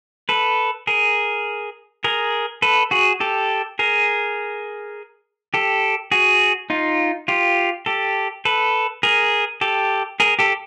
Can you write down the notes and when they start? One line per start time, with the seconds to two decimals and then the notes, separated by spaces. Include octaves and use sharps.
0.29 A4 B4
0.87 G#4 A#4
2.04 G#4 A#4
2.62 A4 B4
2.91 F#4 G#4
3.20 G4 A4
3.79 G#4 A#4
5.54 G4 A4
6.11 F#4 G#4
6.70 D#4 F4
7.28 F4 G4
7.86 G4 A4
8.45 A4 B4
9.03 G#4 A#4
9.61 G4 A4
10.20 G#4 A#4
10.39 G4 A4